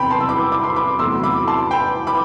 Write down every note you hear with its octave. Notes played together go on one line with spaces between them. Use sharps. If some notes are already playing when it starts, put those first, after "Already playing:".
Already playing: E2 C3 F#3 G5 B5 C6
A5 C6
E6
B5 D6
B5 D6
C6
B5 D6
E2 C3 F#3 A3 C6 E6
B5 D6
A5 C6
G5 B5
B5 D6